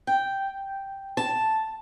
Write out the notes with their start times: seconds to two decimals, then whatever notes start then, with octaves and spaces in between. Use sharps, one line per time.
0.07 G5
1.17 A5